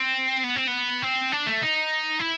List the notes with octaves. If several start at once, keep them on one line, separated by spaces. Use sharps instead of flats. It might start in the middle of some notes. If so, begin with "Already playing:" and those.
Already playing: C4
B3
C4
B3
C4
D4
A3
D#4
E4